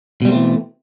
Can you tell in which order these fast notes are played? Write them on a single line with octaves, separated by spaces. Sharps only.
B2 G3 C4 A3 E3